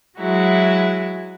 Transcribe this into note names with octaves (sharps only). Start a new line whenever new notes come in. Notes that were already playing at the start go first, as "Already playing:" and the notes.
F#3 G#3 E4 F#4